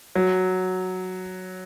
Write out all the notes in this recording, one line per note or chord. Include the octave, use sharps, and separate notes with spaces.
F#3